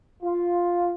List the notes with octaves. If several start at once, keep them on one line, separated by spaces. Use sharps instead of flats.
F4